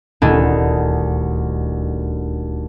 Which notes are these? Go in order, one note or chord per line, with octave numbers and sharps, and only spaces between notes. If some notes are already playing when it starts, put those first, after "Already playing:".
D#1 D2 D4 E4 D#5